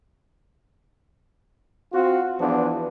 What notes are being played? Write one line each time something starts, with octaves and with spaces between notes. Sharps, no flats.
C4 F4 F#4
E2 F3 B3 D4